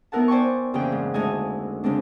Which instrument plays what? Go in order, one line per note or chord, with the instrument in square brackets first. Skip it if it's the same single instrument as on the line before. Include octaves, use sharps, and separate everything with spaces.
[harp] B3 D#4 E4 A#4 F#5 A5
C5 D5 G5 G#5 C#6
F2 C#3 E3 A#3 G#4 G5
G#2
D2 G#3 D4 D#4 D#5 G#5
C#3 G#3 C4 D4